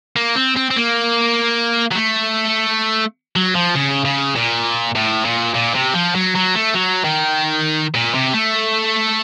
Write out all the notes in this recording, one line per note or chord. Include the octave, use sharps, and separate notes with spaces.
A#3
C4
C4
C4
A#3
F#3
A3
F#3
F3
C#3
C#3
A#2
A2
A#2
A#2
C3
F3
F#3
F#3
A3
F#3
D#3
A#2
C3
A3